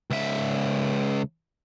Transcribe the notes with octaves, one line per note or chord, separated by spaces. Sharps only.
C#2 E5